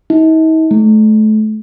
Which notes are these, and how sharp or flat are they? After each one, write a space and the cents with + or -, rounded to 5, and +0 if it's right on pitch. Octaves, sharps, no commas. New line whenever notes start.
D#4 +45
A3 -30